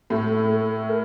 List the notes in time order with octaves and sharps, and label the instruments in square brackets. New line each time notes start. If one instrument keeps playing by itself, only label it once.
[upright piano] A2 [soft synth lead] A4
[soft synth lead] A4
A#4